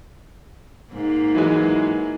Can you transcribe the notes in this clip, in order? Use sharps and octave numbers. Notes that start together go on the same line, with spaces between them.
G#2 A#3
E3 F#3 G#3